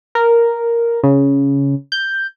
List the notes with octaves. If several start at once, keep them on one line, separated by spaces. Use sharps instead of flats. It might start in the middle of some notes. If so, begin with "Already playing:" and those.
A#4
C#3
G6